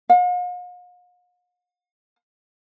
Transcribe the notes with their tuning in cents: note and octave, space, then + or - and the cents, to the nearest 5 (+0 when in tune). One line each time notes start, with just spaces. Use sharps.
F5 +45